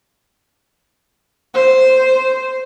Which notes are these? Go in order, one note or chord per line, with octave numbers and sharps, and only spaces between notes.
C5